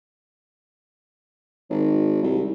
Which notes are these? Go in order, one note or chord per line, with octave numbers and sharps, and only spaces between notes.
G#1
C2